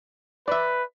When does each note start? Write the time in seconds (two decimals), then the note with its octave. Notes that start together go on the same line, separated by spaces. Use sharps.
0.48 B4 D5 E5